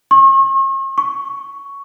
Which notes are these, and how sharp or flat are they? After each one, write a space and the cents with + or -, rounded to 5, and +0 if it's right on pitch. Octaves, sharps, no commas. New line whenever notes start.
C#6 -45
C#6 +10